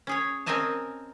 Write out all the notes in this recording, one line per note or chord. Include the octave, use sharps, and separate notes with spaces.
C#4 G#4 C#5
C4 C#4 A#4 D#5 G#5 A5